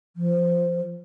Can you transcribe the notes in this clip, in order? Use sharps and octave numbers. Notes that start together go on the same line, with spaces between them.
F3